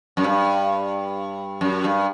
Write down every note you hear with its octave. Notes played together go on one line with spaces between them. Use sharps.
F#2
G2
F#2
G2